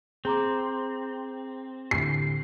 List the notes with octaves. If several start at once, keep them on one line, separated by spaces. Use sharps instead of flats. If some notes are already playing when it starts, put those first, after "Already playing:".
C4 G#4 A#5 D6
A2 D3 G4 C7